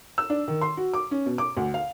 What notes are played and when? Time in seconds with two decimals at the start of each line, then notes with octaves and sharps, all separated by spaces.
0.18 E6
0.30 D4
0.48 D#3
0.61 C6
0.77 F#4
0.93 D6
1.11 C#4
1.26 B2
1.38 D6
1.57 D2
1.74 F5